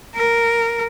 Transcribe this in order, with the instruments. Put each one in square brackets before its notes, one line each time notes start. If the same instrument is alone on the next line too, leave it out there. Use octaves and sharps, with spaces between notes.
[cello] A#4